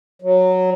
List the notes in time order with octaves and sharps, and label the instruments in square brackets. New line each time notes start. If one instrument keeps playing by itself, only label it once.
[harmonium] F#3